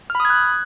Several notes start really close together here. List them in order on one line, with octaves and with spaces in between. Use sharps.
F6 B5 D#6 G#6 F#6